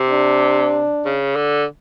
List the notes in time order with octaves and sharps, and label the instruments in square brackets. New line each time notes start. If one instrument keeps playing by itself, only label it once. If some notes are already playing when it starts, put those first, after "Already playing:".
Already playing: [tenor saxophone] C3
[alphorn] D4
[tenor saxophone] C#3
D3